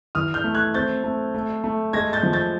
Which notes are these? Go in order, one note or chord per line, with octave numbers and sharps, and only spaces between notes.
E3 D#6 F6
F6 G6
A3
F#6 G#6
C4 G6 A6
A3
A3
A3
G#3 G#6 A#6
G6 A6
F3
G6 A6